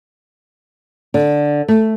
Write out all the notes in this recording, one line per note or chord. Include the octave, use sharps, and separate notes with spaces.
D3
A3